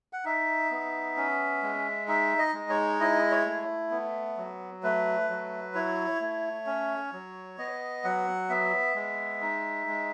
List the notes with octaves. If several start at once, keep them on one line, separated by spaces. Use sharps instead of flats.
F#5
D#4 E5
B3
C#4
G#3
D#4 E5
D#5
G#3
C#5
E4 D#5
C#5
A3
B3
F#3
A3 B4
F#3
E4 C#5
A3
C#4
F#3
B3 D#5
F#3 F#5
B3 E5
G#3
D#4
G#3